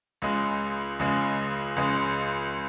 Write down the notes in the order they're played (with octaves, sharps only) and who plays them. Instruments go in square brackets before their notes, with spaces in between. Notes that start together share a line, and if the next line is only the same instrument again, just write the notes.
[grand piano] C#2 C#3 G#3
C#2 C#3 G#3
C#2 C#3 G#3